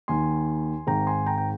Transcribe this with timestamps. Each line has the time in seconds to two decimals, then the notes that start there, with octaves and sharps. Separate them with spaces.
0.08 D#2 D#3 G#5 C6
0.87 G#1 G#2 D#3 G5 A#5
1.07 G#5 C6
1.26 G5 A#5
1.38 G5